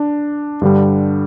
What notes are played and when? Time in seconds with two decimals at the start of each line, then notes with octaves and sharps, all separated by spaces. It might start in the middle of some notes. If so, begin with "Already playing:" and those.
Already playing: D4
0.62 G2 D3 G3